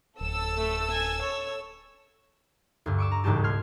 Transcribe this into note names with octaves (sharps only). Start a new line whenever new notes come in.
D1 A4 E6
A3
G#5
C#5
D2 G2
C#6 D6 E6
A#5
E1 C#2 G#2 G3 G4 A5
C6 F6 G#6